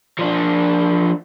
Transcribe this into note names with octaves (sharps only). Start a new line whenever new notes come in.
F3 D4